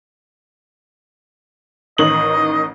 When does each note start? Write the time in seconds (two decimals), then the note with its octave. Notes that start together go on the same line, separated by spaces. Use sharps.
1.98 A1 D#3 D#5 F#7